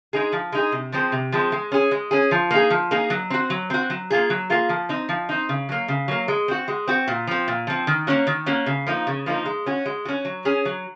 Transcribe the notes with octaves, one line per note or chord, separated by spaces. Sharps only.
G#3 D#4 G#4
F3
G#3 D#4 G#4
C3
F3 G#3 C4
C3
F3 G#3 C4
G#3
C#4 G#4
G#3
C#4 G#4
F3
A#3 D#4 G#4
F3
A#3 D#4 G#4
F#3
C4 F#4
F#3
C4 F#4
F#3
A#3 F4 G#4
F#3
A#3 F4 G#4
F3
C4 D#4
F3
C4 D#4
C#3
F#3 A#3
C#3
F#3 A#3
G#3
C4 F#4
G#3
C4 F#4
A#2
F3 C4
A#2
F3 C4
D#3
A#3 C#4 F#4
D#3
A#3 C#4 F#4
C#3
F3 A#3 D#4
C#3
F3 A#3 D#4
G#3
C#4 F#4
G#3
C#4 F#4
F#3
C#4 G#4
F#3